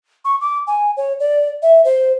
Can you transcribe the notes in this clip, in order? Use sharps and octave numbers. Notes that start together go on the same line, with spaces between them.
C#6
D6
G#5
C#5
D5
E5
C5